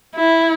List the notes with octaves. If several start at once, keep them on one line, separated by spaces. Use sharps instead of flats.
E4